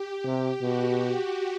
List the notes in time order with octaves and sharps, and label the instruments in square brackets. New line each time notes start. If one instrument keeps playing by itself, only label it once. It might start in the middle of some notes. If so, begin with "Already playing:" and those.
Already playing: [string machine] G4
[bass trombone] C3
[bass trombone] B2 [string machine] F#4